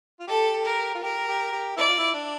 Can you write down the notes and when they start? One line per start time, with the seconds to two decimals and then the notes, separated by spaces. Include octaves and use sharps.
0.20 F4
0.27 G4 A4
0.65 A#4
0.95 F4
1.03 G4 A#4
1.28 G4
1.53 G4
1.77 E4 D5
1.88 F4
1.98 E4
2.14 D4